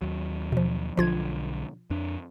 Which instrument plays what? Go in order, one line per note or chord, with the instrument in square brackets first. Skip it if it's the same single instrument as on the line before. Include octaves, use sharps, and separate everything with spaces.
[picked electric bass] D#2 F#3
[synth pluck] B2 F3
[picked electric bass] B1 D3 [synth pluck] F3 F4 G#6
[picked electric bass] F2 D4